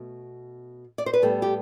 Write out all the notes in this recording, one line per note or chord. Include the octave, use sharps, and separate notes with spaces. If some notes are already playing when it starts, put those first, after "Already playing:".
Already playing: B2 A3
D5
C5
B4
A2 G3 B3 A4
G4